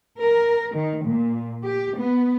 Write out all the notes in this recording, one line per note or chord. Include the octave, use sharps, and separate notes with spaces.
A#4
D#3
A#2
G4
B3